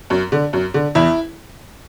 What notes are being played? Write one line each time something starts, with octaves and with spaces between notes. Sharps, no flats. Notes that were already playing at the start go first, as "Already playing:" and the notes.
F#2
D3
F#2
D3
E2 E4